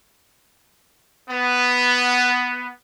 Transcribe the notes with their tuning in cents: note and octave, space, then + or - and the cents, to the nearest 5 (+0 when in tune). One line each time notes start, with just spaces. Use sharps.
B3 +5